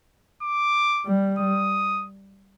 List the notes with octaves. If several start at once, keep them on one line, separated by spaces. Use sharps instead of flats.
D6
G3
D#6